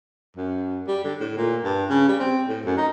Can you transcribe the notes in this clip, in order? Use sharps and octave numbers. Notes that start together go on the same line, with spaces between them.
F#2
G3
D3
A2
A#2
G2
C#3
G3
C4
A2
F#2
D#4